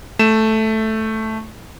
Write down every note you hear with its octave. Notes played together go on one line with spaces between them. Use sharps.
A3 E7